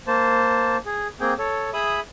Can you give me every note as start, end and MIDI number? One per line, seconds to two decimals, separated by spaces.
0.07 0.77 58
0.07 0.77 72
0.07 0.77 81
0.86 1.08 68
1.20 1.34 58
1.20 1.34 60
1.20 1.34 68
1.20 1.34 79
1.38 1.70 69
1.38 1.70 73
1.73 2.00 68
1.73 2.00 76
1.73 2.00 83
1.73 2.00 87